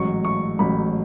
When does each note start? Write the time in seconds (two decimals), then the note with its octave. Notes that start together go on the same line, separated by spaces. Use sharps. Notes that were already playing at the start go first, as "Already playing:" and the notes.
Already playing: A1 G#2 F#3 C#6
0.25 C#6
0.59 A1 G#2 F#3 B5